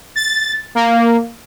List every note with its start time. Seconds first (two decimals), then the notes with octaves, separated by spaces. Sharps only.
0.16 A6
0.75 A#3